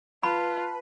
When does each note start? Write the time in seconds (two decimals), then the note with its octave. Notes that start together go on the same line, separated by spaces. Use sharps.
0.23 F4 B4 A5 B5